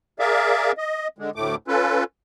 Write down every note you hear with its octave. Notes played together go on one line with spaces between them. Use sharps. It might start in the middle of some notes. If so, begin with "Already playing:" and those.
G#4 A#4 D5 E5 F5
D#5
D3 G#3
D2 A2 A3 D6
C#4 F4 A4 B4